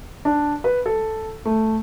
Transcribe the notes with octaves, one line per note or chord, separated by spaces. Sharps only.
D4
B4
A4
A3